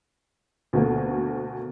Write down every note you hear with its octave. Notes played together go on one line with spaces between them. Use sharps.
D2 B2 A3 A#3